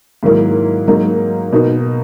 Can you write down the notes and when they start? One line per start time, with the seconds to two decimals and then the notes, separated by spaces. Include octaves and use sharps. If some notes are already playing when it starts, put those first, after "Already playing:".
0.23 G#2 D#3 F#3 A#3 E4
0.87 G#2 F#3 A#3 D#4
1.52 B2 A#3 D#4